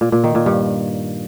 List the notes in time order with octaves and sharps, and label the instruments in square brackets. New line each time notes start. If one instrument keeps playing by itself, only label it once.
[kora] A#2
A#2
D#3
A#2
G2